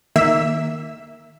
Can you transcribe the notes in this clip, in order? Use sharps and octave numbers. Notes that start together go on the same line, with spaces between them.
D#3 A#3 E5 E6